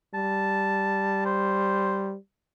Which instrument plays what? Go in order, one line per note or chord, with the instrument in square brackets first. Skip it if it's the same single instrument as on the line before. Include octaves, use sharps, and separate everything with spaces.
[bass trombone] G3 [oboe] A5
[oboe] C5